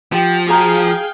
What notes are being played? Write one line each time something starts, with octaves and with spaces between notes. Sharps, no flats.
F3 G4 F#5
F#4 G#4 F5 G5 A#5